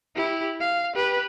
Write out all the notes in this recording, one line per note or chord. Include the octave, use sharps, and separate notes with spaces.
E4 G4
F5
G4 B4